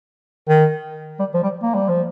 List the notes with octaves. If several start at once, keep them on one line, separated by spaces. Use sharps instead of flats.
D#3
G3
F3
G3
A#3
G3
F3